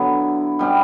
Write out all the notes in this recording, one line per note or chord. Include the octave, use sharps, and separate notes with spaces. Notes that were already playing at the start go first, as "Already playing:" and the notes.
Already playing: D3 F#3 B3 E4
B2 G3 C#4 E4